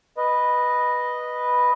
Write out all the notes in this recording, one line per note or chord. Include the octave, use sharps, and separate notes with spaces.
B4 D#5